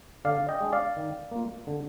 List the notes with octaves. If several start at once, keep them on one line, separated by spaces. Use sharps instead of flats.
D3 D5 F5
D#5 G5
G#3 D4
D5 F5
D#3
A#3 F4
D3